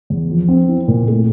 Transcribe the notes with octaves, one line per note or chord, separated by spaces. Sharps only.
E2
F3
C4
E4
A#2
A3